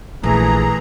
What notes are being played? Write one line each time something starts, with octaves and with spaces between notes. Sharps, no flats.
A#1 E3 A3 G#4 A#5